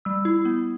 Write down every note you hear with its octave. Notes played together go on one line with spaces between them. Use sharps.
G3 E6
E4
B3